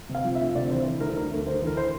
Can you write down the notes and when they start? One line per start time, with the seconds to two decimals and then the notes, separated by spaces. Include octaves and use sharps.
0.09 C3
0.15 F5
0.25 F3
0.35 E5
0.40 D2
0.55 C3 D5
0.70 E3 C5
0.85 E3
1.01 D2 A#4
1.16 D2 A#4
1.32 D2
1.47 D2 C5
1.62 E3
1.67 A#4
1.77 C5